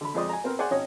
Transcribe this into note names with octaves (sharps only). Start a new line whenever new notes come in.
D3 B5
F2 F3 G#3 C5 D5 D#6
G#5 A#5
B3 C4 A#4
G#4 C5 D5 F#5 G#5
G#1 C#4 C#5 D#5